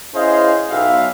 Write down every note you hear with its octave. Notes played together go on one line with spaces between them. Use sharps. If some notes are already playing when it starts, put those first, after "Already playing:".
C#4 E4 G#4 C5 D#5 F5
B1 E5 F5